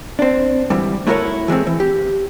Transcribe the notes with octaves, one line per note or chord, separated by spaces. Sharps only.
C4 D4
D2 G#2 E3 G3
A3 E4 F#4 A#4 B4 C#5
E3 G#3 A3 C4
E3
G4